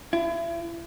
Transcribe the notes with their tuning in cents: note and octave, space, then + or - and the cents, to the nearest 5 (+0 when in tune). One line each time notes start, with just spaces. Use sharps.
E4 +35